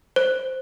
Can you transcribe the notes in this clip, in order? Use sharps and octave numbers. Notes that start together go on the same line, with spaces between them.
C5